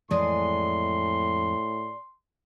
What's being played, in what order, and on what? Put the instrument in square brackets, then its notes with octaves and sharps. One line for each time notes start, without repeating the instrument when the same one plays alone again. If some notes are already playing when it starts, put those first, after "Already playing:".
[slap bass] F2 E3 G#3 [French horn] A2 [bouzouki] D4 G#4 D#5 [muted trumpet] C6